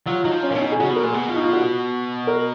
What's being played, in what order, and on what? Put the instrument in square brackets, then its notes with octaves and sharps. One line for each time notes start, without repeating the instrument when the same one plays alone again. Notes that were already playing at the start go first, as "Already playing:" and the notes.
[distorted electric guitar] F#3 [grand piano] F4
[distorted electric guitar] F#3 [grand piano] D#4
[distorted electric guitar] F3
[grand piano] C#4
[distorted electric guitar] A#2
[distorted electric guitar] B2 [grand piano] C#4
[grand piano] D#4
G#4
[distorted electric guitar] C#3 [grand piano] F#4
[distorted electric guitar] B2
[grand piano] A#4
[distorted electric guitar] A#2 [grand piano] G#4
[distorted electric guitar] B2
[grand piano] F4
D#4
F4
F#4
A#4